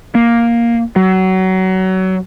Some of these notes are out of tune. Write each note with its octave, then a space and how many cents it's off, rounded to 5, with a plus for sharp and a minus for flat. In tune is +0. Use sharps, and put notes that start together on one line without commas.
A#3 +5
F#3 +25